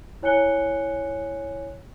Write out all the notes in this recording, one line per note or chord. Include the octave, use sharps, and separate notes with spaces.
E4 C#5 G#5 F#6 C#7 G7